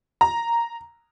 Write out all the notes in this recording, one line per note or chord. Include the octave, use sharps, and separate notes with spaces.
A#5